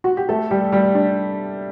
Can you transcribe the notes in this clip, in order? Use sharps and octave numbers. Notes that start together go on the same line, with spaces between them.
F#4
G4
A3 A4
G3 G4
G3 G4
D4